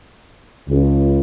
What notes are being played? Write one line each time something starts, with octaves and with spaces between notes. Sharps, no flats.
C#2